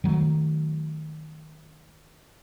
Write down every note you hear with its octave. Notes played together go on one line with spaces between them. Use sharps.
D#3 F#3 A3